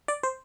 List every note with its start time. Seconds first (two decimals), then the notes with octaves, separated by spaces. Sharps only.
0.08 D5
0.23 C5